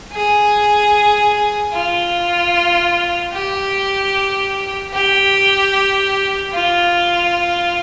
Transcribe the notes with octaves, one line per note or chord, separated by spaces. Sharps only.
G#4
F4
G4
G4
F4